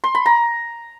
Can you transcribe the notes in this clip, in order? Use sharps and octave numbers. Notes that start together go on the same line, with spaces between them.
C6
B5
A#5